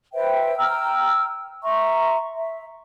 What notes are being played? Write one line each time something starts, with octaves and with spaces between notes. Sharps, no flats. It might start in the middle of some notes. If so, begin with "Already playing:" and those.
B4 C5 E5 G5
G5 A#5 E6 F6
E5 A#5 C6 C#6
E5